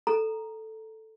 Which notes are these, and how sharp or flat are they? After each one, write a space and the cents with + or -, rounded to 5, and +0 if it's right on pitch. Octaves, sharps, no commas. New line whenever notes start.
A4 +0 A#5 +0